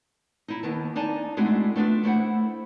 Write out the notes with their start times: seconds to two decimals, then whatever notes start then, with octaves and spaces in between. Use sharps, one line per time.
0.48 D#4 E4
0.63 D#2 D#3 B3 A5
0.95 D4 D#4 D5 G#5 A5
1.37 G#3 A3 C4 D4 E4 F#4
1.76 A3 B3 D4 F4
2.03 A3 E4 C5 F#5